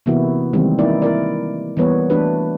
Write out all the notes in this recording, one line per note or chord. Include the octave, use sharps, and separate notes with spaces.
C3 E3 A#3 B3 E4 F#4
D#3 E3 G3 G#3 A#3 C4
A#3 D#4 E4 D5
E4 A#4 D5
E3 G3 A#3 B3 B4 C#5
E3 A3 D4 F#4 B4